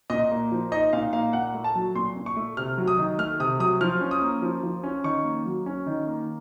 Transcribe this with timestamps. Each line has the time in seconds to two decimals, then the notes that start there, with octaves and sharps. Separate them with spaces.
0.10 A#2 D#5
0.31 A#3
0.52 F3
0.72 D#4 D#5
0.93 A#2 F5
1.13 A#3 F5
1.33 A#2 F#5
1.54 A3
1.64 A5
1.75 F#3
1.95 A#2 C6
2.16 A#2
2.26 C#6
2.36 A3
2.57 C3 F6
2.78 F#3
2.88 D#6
2.98 D#3
3.18 A3 F6
3.39 C3 D#6
3.60 F#3 D#6
3.81 F3 F6
4.01 C#4
4.11 D#6
4.22 A#3
4.42 F3
4.63 F3
4.84 C#4
5.04 D#3 C#6
5.24 A#3
5.45 F#3
5.66 C#4
5.86 D#3
6.07 A#3